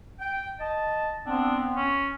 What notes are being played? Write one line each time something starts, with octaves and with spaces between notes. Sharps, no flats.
G5
D#5 A5
B3 C4 D4
C#4